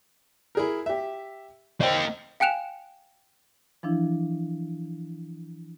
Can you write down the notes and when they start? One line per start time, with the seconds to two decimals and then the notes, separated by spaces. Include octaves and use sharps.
0.55 E4 G#4 A#4
0.86 G4 E5
1.80 A#3 C5 D#5 G5
2.40 F5 G5 G#5 F#6 E7 F7
3.83 E3 F3 D4 E4